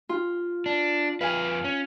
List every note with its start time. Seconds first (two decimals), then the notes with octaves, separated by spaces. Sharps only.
0.09 F4
0.66 D4
1.21 F2 B4 F5 G#5
1.64 C#4